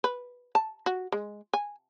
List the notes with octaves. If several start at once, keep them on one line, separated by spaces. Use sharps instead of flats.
B4
A5
F#4
G#3
G#5